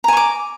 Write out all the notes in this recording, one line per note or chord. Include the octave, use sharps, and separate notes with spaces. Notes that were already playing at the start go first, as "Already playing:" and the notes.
G#5 A#5 C#6 D6